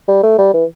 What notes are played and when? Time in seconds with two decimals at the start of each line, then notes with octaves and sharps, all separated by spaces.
0.08 G3
0.23 A3
0.38 G3
0.54 E3